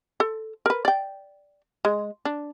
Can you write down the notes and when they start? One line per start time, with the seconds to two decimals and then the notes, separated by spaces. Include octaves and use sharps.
0.20 A4
0.66 A#4 B4
0.85 D5 G5
1.85 G#3
2.25 D4